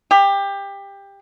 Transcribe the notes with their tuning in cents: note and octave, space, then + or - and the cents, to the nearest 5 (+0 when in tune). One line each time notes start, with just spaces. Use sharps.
G4 +20